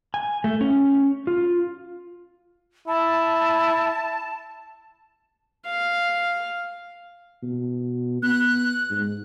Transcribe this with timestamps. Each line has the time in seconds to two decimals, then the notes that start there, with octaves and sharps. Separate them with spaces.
0.14 G#5
0.44 A3
0.61 C#4
1.27 F4
2.88 E4 A5
5.65 F5
7.43 B2
8.23 B3 F#6
8.90 G#2